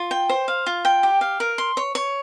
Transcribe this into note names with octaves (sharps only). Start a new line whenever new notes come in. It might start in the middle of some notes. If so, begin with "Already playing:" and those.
Already playing: F4
G5
C5
F5
F4
G5
G4
F5
A#4
C6
C#5
C#5